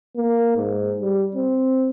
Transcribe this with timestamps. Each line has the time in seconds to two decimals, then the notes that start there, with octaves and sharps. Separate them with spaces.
0.16 A#3
0.57 G#2
1.01 G3
1.35 C4